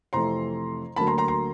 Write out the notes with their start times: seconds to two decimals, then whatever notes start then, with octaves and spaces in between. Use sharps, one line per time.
0.13 F2 C3 E3 A3 A#5 C6
0.96 D2 D3 F#3 A#3 A5 B5
1.07 A#5 C6
1.18 A#5 C6
1.28 A#5 C6